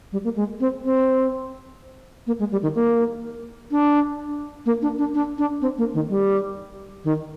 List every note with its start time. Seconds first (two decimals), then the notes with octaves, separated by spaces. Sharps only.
0.12 G3
0.24 A#3
0.36 G#3
0.60 C4
0.84 C4
2.27 A#3
2.39 G#3
2.52 G3
2.63 D#3
2.75 A#3
3.71 D4
4.66 A#3
4.82 D4
4.98 D4
5.14 D4
5.38 D4
5.61 C4
5.78 A#3
5.94 D#3
6.09 G3
7.04 D#3